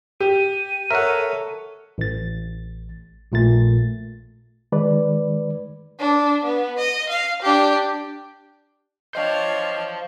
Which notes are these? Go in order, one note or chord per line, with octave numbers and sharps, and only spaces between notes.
G4 D#7
A4 A#4 C#5 E5 F#5
A1 A6
A#1 A#2 A3 A6
D#3 G#3 B4 D5
D4
B3
D#5
F5
D4 G4
D4 C5 C#5 D#5 F5 G5 G6